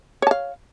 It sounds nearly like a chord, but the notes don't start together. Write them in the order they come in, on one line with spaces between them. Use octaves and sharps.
C#5 A5 F5